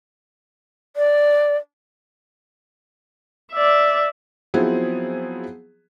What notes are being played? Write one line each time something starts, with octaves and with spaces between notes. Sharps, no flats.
D5
D5 E5
F3 F#3 B3 C4 E4 G#4